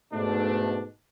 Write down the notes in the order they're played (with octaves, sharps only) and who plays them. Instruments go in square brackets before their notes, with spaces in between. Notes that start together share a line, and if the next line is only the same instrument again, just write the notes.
[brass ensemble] G#2 B2 A3 D4